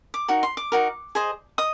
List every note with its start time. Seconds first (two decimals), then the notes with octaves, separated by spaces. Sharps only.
0.14 D6
0.28 D#4 F#4 A#4
0.43 C6
0.57 D6
0.72 D#4 F#4 A#4
1.15 G#4 C5 D#5
1.58 D#5 D#6